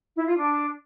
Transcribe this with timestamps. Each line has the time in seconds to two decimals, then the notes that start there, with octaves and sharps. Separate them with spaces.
0.15 E4
0.26 F4
0.38 D4